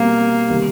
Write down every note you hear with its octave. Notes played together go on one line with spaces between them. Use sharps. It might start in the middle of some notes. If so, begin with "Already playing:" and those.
Already playing: B2 G3 A#3 C4
C3 D#3 G3 B3